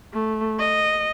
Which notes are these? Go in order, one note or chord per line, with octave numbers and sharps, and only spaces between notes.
A3
D#5